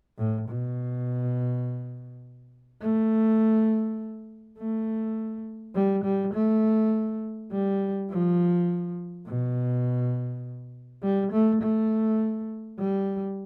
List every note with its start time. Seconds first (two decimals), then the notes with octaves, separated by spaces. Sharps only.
0.18 A2
0.48 B2
2.82 A3
4.58 A3
5.75 G3
6.04 G3
6.34 A3
7.51 G3
8.09 F3
9.26 B2
11.03 G3
11.32 A3
11.62 A3
12.79 G3